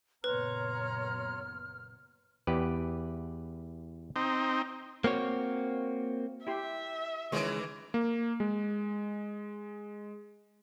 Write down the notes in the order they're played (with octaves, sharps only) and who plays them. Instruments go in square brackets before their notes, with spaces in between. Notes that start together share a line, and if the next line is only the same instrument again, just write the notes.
[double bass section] F#1 A#2 B3 [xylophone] B4 [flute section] C#5 A#5 C6 [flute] F6
[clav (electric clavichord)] E2 G4 B4
[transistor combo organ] C4 D#4
[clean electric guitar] A#3 C4 F#4 C#5
[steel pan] E4 G4 C6 [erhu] E5
[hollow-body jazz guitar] C#2 G#3 [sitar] D#3 E3 [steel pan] C#6
[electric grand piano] A#3
G#3